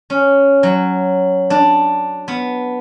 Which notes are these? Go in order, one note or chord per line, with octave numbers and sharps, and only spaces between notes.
C#4
F#3
D4
B3